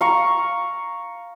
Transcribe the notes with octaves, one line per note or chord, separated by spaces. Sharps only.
F5 A#5 C#6